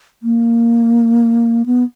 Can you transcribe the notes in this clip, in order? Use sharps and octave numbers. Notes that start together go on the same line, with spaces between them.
A#3
B3